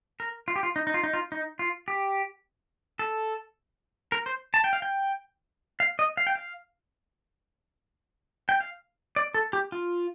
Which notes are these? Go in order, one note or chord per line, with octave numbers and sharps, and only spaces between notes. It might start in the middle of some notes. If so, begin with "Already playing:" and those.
A#4
F4
G4
F4
D#4
D#4
F4
D#4
F4
D#4
F4
G4
A4
A#4
C5
A5
G5
F5
G5
F5
D#5
F5
G5
F5
G5
F5
D5
A4
G4
F4